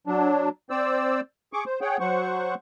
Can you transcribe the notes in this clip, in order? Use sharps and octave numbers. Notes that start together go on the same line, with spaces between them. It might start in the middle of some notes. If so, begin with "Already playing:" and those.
F#3 D4
C4 C5 D5 E6
G#4 C#6 D6
C5
G#4 C#5 F#5 G5
F#3 C5 F#5 C#6